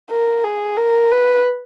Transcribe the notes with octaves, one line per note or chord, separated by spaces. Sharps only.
A#4
G#4
A#4
B4